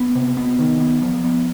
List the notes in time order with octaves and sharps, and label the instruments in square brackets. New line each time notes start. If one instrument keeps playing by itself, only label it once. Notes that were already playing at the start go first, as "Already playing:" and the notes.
Already playing: [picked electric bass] B3
C3
B3
D#3
B3
F3
B3